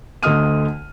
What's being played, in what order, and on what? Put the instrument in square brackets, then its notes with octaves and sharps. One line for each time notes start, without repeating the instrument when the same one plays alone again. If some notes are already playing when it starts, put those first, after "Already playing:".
[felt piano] D2 D3 D#5 D#6 F6 D#7